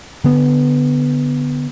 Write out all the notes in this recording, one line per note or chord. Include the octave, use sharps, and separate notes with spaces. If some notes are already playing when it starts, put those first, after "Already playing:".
D3 B3